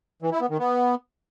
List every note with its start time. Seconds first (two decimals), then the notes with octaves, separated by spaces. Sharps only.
0.22 E3
0.32 E4
0.41 B3
0.50 D#3
0.59 B3